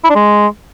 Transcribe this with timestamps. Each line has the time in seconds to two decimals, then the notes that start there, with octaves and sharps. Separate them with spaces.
0.04 E4
0.10 D4
0.15 G#3